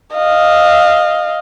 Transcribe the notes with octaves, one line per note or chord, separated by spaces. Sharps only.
D#5 F5